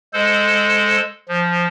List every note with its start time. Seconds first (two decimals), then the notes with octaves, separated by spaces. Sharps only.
0.13 G#3 A4 C5
1.28 F3